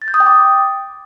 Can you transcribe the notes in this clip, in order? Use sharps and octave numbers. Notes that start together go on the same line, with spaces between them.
A6
G6
D#6
G5
D6